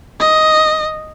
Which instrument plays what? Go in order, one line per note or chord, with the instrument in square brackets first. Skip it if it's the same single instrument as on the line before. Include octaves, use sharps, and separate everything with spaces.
[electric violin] D#5